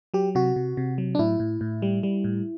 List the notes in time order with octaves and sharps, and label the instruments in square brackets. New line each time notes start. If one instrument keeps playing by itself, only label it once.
[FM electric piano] F#3 G4
C3 F#4
C3
C3
F#3
D4
A2 E4
A2
A2
G3
G3
A2